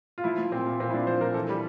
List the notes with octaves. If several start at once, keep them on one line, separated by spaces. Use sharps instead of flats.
F4
F3 E4
F3
A#2 C4
A#2
A#2 C4
E4
F3 D4
F3 C5
F3 A#4
E3 A4
G3